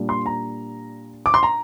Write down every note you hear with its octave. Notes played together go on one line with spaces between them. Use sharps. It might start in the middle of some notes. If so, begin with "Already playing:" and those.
Already playing: A#2 G3 D4
C6
A#5
D6
C6
A#5